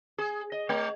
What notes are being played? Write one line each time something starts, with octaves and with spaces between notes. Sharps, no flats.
G#4
D#5
A3